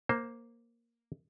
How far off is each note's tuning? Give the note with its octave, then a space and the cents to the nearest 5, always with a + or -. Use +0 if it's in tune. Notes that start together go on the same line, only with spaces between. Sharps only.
A#3 +0 C5 +10